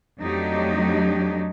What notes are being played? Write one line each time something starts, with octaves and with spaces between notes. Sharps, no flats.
F2 F#3 A3 D4 D#4 G4